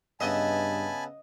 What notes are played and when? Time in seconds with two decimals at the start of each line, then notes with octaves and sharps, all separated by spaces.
0.20 G2 C#3 B3 D#5 E5 G#5 A5 B5